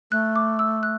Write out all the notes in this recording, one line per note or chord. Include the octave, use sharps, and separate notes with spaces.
A3 F#6
D6
E6
F#6